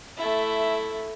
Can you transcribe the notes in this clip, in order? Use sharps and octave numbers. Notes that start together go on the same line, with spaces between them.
A3 E4